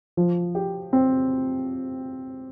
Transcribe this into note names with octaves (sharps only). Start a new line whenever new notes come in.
F3
G4
C4